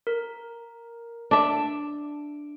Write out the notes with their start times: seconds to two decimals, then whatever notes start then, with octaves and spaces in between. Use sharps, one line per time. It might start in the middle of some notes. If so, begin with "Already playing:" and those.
0.07 A#4
1.31 D4 E5 D7